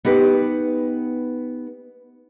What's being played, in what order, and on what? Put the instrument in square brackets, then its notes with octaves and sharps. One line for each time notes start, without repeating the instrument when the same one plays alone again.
[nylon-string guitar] B3 D#4 G4 B4